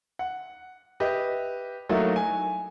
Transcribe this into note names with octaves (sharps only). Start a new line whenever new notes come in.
F#5
G4 B4 D#5 E5
F#3 A3 A#3 D#4 E4 F#4
G#5